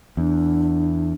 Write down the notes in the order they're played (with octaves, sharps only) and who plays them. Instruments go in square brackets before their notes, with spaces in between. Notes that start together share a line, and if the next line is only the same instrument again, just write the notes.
[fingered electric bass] E2 [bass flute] D4